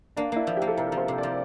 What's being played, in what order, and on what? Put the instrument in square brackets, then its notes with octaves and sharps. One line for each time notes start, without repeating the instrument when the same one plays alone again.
[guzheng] A#3 [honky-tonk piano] D4
[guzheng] A#3 [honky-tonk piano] E4
[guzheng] F3
[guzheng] A#3 [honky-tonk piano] G4
[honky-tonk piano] A4
[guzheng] C3 [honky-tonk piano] A#4
[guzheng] F3
[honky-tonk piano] C5
[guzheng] C3
[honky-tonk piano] D5
[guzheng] F3